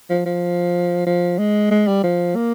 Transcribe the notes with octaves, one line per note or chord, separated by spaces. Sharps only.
F3
F3
F3
G#3
G#3
G3
F3
A#3